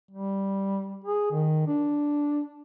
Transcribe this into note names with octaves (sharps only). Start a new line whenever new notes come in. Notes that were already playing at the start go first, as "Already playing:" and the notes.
G3
G#4
D#3
D4